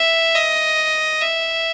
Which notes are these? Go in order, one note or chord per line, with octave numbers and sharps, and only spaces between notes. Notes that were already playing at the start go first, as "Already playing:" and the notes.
Already playing: E5
D#5
E5